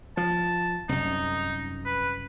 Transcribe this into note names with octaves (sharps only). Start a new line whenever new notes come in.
F3 A5
C2 F#2 D#4
B4